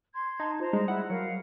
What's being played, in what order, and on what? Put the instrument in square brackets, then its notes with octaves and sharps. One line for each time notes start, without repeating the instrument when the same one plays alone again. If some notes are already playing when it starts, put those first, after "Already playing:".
[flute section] C6 G#6
[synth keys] D#4 [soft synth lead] A5
[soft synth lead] F4 [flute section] C5 A#5
[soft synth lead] G3 [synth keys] G#3 D#4
[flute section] E4 [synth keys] F#5
[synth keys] F#3 [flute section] A#4 F5 [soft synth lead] C#7